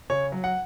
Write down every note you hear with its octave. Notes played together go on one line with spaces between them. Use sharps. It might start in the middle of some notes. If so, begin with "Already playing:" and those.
C#3 C#5
F#3
F#5